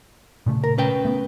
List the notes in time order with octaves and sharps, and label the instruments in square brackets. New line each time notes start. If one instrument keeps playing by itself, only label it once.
[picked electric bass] A#2 C#3 A3
[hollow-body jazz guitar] A#4
C#4 B4 G5
[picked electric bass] A3 B3